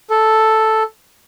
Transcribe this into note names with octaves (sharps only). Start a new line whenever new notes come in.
A4